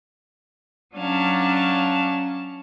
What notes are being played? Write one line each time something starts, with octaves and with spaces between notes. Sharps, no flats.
F#3 C#4 D4 F5 A5